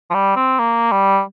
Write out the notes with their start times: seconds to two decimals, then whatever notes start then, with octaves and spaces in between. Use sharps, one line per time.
0.10 F3
0.14 G3
0.36 C4
0.59 A#3
0.92 G3